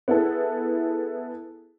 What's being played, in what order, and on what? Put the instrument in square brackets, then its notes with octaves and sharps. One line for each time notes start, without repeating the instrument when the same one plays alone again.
[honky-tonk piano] B3 E4 G#4 A4